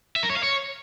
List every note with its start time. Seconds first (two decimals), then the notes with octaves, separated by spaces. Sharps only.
0.16 E5
0.23 A#4
0.30 C#5
0.37 F5
0.43 C#5